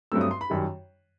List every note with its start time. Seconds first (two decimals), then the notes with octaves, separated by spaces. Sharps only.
0.12 G2 F#3 A3 C4 E6
0.21 D#6
0.31 C6
0.41 B5
0.50 F#2 D#3 G3